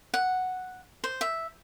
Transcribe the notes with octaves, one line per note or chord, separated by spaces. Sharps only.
F#5
C5
E5